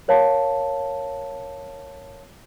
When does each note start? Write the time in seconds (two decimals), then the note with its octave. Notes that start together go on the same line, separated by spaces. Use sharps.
0.08 A#4 C#5 F5 A5